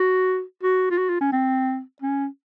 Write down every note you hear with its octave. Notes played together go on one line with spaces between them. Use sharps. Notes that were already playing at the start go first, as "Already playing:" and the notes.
Already playing: F#4
F#4
F4
F#4
F4
C#4
C4
C#4